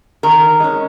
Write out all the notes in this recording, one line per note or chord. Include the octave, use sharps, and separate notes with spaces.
D#3 A#4
G#3 C#4